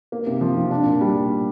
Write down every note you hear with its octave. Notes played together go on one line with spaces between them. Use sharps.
A#3
C3
F3
C3
D4
A#2
G3